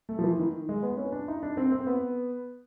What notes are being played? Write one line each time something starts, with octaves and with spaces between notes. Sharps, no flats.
A3
F3
E3
D#3
G#3
B3
C#4
D4
D#4
D4
C4
C4
B3